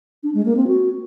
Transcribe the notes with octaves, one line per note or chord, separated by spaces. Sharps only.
D4
G#3
A#3
C4
F#4